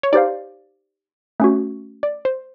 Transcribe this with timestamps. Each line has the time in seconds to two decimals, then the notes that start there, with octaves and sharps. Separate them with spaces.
0.03 C#5
0.13 D#4 G4 C5 D5 F5
1.40 A3 C#4 F#4
2.03 D5
2.25 C5